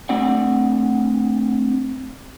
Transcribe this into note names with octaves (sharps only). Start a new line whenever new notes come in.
A3 C4 D4 D5 F#5